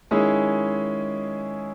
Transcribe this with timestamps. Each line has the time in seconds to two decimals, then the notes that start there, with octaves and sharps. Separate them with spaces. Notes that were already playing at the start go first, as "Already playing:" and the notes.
0.11 D#3 G#3 C#4 E4 G#4